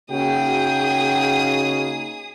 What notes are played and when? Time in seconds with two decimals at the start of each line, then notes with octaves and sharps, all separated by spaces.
0.11 C#3 A#3 D#4 F#4 G#4 G5 D#6